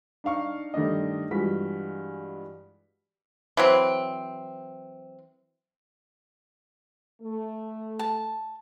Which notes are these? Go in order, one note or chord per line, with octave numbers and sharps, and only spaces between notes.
D4 D#4 F5 C#6
G2 D#3 A3 D4 D#5
G2 E3 G#3 F4 F#4 B6
E3 F#3 C4
A3
A5